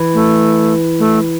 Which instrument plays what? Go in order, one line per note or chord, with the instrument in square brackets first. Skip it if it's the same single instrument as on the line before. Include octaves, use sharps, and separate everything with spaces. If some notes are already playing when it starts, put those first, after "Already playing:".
Already playing: [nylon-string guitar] E3
[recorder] A3
A3